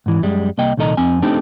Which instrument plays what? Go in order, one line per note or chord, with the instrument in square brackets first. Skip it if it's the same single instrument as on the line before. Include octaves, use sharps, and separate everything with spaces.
[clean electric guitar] G#2 E3
F#2 G3 G#3
C2 A#3 D#5 G5
C2 A#2 D#3 A4 D#5 A#5
F2 C4 G#5
A3 C4 D4 D#4 G4 A4